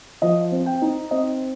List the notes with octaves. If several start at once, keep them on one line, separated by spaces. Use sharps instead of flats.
F3 D#5
C4
G5
D#4
C4 D#5